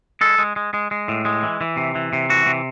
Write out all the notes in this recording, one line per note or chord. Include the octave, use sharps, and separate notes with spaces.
G#3 A4
G#3
G#3
G#3
G#3
A2
G#3
E3
E3
C3
E3
C3
E3 F#4
C3